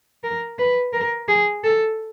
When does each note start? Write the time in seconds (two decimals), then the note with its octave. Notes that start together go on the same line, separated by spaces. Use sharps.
0.24 A#4
0.59 B4
0.93 A#4
1.28 G#4
1.64 A4